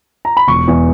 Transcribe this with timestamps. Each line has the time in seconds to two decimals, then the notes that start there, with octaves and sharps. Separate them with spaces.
0.25 A#5
0.37 B5
0.48 E1 C#6
0.68 E2